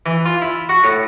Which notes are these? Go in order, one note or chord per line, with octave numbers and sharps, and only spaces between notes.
E3
F4
E4
F#4
A2